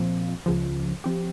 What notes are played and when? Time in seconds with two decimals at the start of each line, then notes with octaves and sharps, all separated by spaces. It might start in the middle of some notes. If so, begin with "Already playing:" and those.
Already playing: A#2 F3 C4 F4
0.46 C#2 C#3 F3
1.04 F3 C4 G4